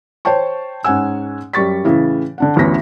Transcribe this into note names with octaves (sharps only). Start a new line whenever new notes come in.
C5 C#5 G5 A5 C#6
G#2 C#4 F#5 G#5 E6
F#2 G3 C#6 A6 B6
A2 C#3 E3
D3 D4 F#5
A1 D2 B3 C#4 A#6 B6